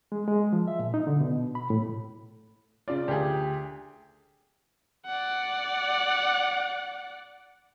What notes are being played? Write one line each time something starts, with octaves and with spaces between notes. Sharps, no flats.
G#3
G#3
F3
E5
A#2
D#4
D3
B2
B5
A2
C#3 F4 D5
D2 G4 G#4
D5 F#5